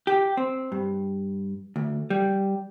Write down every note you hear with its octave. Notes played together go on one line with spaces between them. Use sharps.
G4
C4
G2
D2
G3